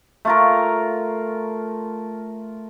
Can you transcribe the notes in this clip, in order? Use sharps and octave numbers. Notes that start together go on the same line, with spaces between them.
A3 F4 A#4